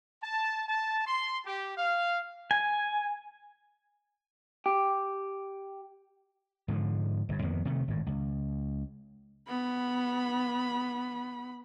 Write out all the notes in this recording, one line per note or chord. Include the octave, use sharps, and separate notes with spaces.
A5
A5
C6
G4
F5
G#5
G4
G#2 D3 D#3 F3
G1 G2
F2 D#3 A#3 B3
C3 D#3 A3
G#1 A2
C#2
B3 B5